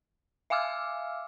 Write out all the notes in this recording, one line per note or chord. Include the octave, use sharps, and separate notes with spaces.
E5 F5 G#5 D6 E6 F6